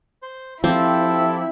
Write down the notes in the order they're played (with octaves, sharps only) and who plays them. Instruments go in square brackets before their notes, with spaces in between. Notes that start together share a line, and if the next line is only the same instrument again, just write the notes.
[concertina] C5
[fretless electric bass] F3 [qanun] C4 [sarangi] E4 [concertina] G4 A4